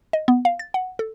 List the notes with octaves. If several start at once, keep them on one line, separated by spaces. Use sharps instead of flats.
D#5
B3
F5
A6
F#5
A4